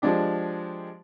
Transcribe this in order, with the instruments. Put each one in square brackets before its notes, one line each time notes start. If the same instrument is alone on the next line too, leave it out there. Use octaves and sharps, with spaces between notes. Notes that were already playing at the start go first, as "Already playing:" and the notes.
[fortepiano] F3 G#3 D4 G4